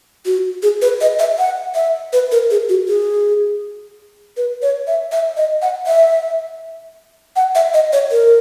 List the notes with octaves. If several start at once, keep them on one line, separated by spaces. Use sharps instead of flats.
F#4
G#4
B4
D#5
E5
F#5
E5
B4
A#4
G#4
F#4
G#4
B4
C#5
E5
E5
D#5
F#5
E5
F#5
E5
D#5
C#5
A#4